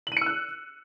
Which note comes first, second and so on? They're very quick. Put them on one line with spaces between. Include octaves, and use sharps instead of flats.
F#7 D#7 C#7 E6 F#6